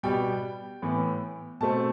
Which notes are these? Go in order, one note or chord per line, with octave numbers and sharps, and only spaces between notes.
B2 G3 B3 G5
A2 E3 B3
B2 A3 C4 A5